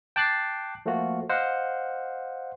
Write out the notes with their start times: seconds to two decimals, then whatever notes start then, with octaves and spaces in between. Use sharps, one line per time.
0.16 G5 A5 D6 F#6 A6 C7
0.86 F3 A3 A#3 F4 F#4
1.29 C5 D#5 F5 F#5